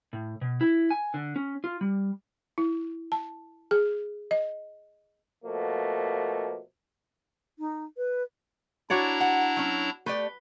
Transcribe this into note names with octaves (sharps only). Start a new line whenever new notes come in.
A2
B2
E4
G#5
D3
C#4
F4
G3
E4
A5
G#4
D#5
B2 F3 A3 A#3
D#4
B4
D4 E4 F#4 C#5 D5 A#5
F#5
F#3 C#4
A3 G4 B4 D5